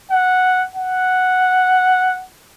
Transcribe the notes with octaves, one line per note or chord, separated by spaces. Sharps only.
F#5
F#5